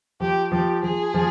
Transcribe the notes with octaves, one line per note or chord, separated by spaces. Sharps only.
F3 G4
F3 G4
F3 G#4
F3